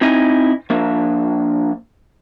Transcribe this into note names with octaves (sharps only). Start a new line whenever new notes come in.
C4 D#4 E4 D#5 G#5
F3 A#3 D4 E5